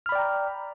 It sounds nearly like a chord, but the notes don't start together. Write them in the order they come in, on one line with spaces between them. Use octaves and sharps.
F6 B5 D5 G5 A#5